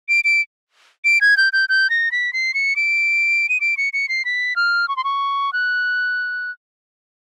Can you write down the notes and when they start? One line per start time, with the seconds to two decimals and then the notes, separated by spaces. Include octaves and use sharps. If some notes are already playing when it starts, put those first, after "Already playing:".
0.09 D7
0.24 D7
1.05 D7
1.21 G#6
1.37 G6
1.53 G6
1.69 G6
1.90 A#6
2.12 B6
2.33 C7
2.54 C#7
2.76 D7
3.49 D#7
3.61 D7
3.77 C#7
3.93 C#7
4.09 C7
4.25 B6
4.56 F6
4.88 C#6
4.97 C6
5.04 C#6
5.53 F#6